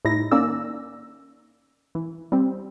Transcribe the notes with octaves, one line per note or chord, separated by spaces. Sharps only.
A2 G3 D#4 E4 A#6
D#3 A#3 C#4 D5 E6
E3
G3 C4